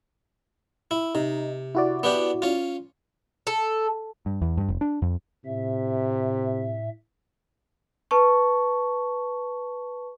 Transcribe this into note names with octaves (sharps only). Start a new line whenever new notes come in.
E4
C3 D#4
E4 F#4 D5
B3 D4 G4
C#4 F4
A4
G2
E2
G2
F1
D4
F2
A2 C3 E5
B4 A5 C#6